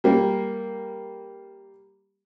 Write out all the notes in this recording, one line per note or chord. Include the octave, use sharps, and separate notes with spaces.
G3 A#3